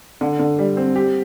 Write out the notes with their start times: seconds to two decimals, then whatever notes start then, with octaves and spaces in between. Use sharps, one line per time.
0.21 D3
0.39 D3
0.59 G3
0.77 C4
0.96 G4